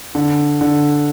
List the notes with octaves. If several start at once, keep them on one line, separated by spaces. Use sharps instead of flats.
D3
D3